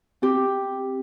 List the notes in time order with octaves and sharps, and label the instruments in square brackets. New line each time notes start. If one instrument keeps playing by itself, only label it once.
[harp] C4 G4